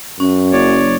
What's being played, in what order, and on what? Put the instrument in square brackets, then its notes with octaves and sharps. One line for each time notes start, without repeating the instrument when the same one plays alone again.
[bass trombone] F#2 [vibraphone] C#4
[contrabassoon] F#1 [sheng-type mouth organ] C#5 D5